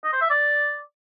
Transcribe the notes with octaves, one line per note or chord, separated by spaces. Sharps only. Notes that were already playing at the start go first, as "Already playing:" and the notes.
D#5
C5
E5
D5